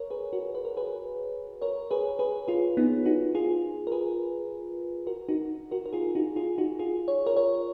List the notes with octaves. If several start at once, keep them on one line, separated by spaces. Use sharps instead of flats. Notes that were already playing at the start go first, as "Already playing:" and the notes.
Already playing: A#4 C#5
G#4 B4
F#4 A#4
B4
A#4
G#4 B4
A#4 C#5
G#4 B4
G#4 B4
F4 G#4
B3 D#4
D#4 F#4
F4 G#4
A#4
G#4 B4
F#4 A#4
D#4 F#4
F#4 A#4
A#4
F4 G#4
D#4 F#4
F4 G#4
D#4 F#4
F4 G#4
C#5
A#4 C#5
A#4 C#5